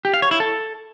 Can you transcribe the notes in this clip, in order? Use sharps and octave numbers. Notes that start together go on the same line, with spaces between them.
G4
F5
C#5
E4
A4